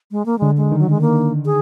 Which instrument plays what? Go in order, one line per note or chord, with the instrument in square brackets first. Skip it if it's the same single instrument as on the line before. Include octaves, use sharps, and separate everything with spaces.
[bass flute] G#3
A#3
[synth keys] D3 [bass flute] G#3
[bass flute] G#3
[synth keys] D#3
[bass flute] F#3
G#3
A#3
G#4